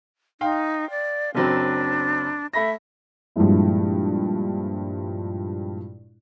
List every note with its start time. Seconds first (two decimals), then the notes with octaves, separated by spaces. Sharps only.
0.41 D#4 F5 G5 C6
0.90 D5
1.35 F#1 F#3 C4 D4
2.54 A3 E5 B5 A#6
3.36 G2 A#2 F3 G#3 E4